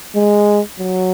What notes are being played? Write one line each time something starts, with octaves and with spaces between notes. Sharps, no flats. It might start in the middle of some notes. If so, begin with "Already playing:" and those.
G#3
F#3